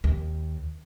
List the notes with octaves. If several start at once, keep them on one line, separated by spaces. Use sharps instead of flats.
D#2